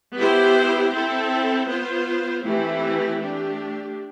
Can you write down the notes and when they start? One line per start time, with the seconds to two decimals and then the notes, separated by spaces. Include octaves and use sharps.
0.16 B3 E4 G4 C5
0.92 C4 E4 A4
1.68 B3 F4 C5
2.45 E3 A3 C4 E4 G4
3.21 A3 D4 G4